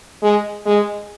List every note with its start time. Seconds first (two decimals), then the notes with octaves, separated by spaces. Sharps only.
0.23 G#3
0.66 G#3